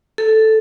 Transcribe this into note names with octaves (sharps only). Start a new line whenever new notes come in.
A4